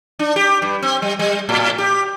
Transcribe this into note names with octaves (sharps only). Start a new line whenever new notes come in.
D4
G4
G2
C4
G3
G3
A2
G4